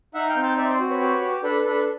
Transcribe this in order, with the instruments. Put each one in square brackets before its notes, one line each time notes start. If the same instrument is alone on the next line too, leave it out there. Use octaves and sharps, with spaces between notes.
[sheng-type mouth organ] D#4 E5 F#5
F5 G5
C4
G5 A5
C4 D5 E5
C5 D5
F#4
B4 C#5
G4
G4
D4 A4 B4
D4 A4 B4